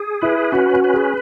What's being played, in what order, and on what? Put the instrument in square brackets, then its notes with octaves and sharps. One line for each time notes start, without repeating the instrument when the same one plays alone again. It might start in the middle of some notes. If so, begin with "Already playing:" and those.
Already playing: [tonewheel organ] G#4
[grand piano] E4 [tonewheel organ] B4
[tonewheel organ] C#4 [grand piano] F#4
[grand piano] F#4
[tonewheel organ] B4
[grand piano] G#4